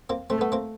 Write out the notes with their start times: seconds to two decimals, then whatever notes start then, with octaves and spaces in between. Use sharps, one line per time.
0.10 A#3 C4
0.30 A3 C4
0.41 B3
0.52 A#3 C4